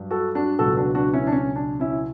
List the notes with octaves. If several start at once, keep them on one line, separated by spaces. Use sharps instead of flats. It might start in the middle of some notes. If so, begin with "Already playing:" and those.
Already playing: G2 F#3
F#4 A4
D4 F#4
C#2 B2 F#3 F#4 A4
D4 F#4
D4 F#4
C#4 E4
D4
C#4
D4
C#4 E4